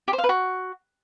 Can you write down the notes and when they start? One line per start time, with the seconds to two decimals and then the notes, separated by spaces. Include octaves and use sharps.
0.08 G4
0.13 C5
0.18 F5
0.24 B4
0.29 F#4